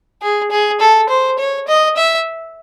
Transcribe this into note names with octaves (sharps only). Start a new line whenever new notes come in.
G#4
G#4
A4
C5
C#5
D#5
E5